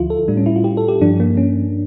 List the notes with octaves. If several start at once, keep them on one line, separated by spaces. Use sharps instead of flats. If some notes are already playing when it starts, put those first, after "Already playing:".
Already playing: D2 D3 F3 E4 F4
A4
A2 G3 D4
C#4
E4
F4
G4
A4
G4
G2 F3 D4
A#3
C#4